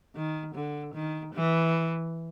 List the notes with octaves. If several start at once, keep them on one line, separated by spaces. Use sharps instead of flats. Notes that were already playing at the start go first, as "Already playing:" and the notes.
D#3
D3
D#3
E3